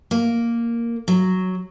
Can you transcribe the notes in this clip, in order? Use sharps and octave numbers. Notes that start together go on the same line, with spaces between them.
A#3
F#3